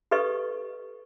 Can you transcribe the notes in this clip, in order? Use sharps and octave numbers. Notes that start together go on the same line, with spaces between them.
G4 A4 B4 D#5 C#6